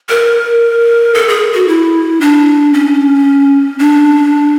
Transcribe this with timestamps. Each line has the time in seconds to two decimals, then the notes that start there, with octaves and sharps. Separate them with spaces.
0.09 A#4
1.14 A4
1.28 G#4
1.54 F#4
1.68 E4
2.21 D4
2.73 C#4
3.79 D4